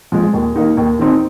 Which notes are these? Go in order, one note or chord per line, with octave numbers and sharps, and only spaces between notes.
F3 G#3
D#2
D#3 A#3 D#4
D#2
D#3 C4 D#4